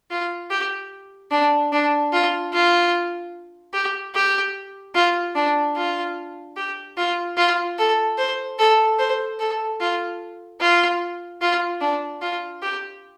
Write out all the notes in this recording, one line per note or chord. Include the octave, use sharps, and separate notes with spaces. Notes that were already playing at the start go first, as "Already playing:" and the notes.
F4
G4
D4
D4
F4
F4
G4
G4
F4
D4
F4
G4
F4
F4
A4
C5
A4
C5
A4
F4
F4
F4
D4
F4
G4